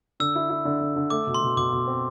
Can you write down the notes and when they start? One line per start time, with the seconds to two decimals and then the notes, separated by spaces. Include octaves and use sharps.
0.20 D3 E6
0.35 E4
0.50 E4
0.65 D3
0.81 D3
0.96 D3
1.10 A3 D6
1.27 B2
1.34 C6
1.42 B2
1.57 B2 D6
1.72 B2
1.87 C4